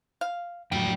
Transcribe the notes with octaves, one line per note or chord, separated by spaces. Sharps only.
F5
F2 A2 F#3 G3 D5 G5